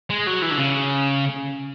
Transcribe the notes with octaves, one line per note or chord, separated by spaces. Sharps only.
G#3
F#3
E3
D3
C#3